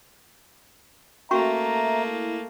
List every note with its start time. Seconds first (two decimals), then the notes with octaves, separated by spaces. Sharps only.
1.31 A3 A#3 C#4 F#4 E5 A#5 C#6
2.06 E4